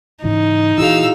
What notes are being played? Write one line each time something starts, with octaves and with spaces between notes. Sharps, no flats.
G#2 C#3 E3 D#4
A#2 E3 E4 F#4 G#4 F5 E6